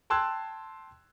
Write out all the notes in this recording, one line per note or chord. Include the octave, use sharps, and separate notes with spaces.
G5 A5 C6 E6 F#6 G#6